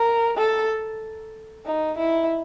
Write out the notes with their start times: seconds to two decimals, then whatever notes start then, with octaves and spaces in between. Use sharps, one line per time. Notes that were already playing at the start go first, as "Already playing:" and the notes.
Already playing: A#4
0.37 A4
1.65 D#4
1.98 E4